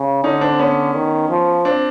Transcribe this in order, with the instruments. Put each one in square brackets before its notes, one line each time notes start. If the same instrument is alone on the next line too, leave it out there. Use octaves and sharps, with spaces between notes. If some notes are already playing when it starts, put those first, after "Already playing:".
Already playing: [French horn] C#3
[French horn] D3 [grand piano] C#4 D#4
[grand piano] C4 D4
B3 C#4
[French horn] D#3
F3
[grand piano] C4 D4